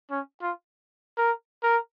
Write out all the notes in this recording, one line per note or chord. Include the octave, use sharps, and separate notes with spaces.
C#4
F4
A#4
A#4